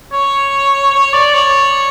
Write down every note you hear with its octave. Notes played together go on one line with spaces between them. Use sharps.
C#5
C#5
D5
C#5